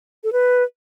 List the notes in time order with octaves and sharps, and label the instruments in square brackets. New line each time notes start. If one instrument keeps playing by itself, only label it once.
[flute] A4
B4